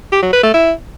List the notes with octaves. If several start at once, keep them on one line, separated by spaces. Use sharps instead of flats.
G4
F#3
B4
A3
E4